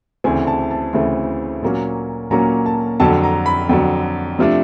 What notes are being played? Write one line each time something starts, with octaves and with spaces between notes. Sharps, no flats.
D2 C#3 E3 A3 C4 G#5
A5
A5
D2 C#3 E3 A3 C4
A#2 F#3 A#3 C#4
A#2 F#3 A#3 C#4 A#5
A5
F2 D3 F#3 A5
A#5
B5
F2 D3 F#3
C3 F3 A3 D4